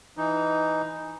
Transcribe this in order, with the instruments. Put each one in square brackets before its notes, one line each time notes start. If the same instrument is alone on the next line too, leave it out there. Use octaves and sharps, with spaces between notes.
[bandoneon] E3 D#4